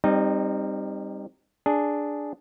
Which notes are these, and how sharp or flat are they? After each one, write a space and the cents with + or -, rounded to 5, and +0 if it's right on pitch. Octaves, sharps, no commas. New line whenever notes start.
G3 +20 C4 +0 D#4 -15
D4 +0 G#4 +0